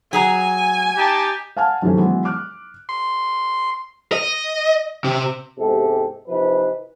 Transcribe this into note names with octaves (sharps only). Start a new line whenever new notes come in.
F#3 G#4 G#5 A#5
D#4 G4 G5 A5
F5 F#5 G#5 A5 F6
F#2 C3 D#3 E3 A3 C#4
E3 F#3 G#3 B3 E4
D6 F6 F#6
C6
D#5
C3
E2 G#2 C3 G#3 G4 A4
C3 E3 F3 D#4 B4